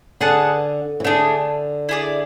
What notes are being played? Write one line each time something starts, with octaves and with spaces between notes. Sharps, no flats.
D3 G#4 B4 F#5 A5
E3
D3 A3 D4 G#4
E4 G#4 D5